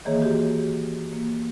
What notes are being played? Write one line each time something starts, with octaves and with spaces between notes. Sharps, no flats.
D#3 E3 A#3 G#4 C#5
F#4 G4
A#3